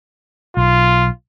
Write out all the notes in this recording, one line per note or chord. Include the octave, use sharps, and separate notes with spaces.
B1 F4